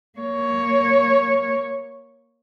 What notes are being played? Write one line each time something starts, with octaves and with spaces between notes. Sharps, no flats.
A#3 C#5